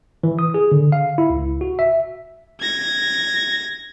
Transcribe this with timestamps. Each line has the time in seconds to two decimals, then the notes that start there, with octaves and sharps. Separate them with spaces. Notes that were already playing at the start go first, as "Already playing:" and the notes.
0.23 E3
0.39 D#6
0.54 G#4
0.72 D3
0.92 F5
1.18 E4
1.30 C#2
1.61 F#4
1.79 E5
2.61 G#6 A#6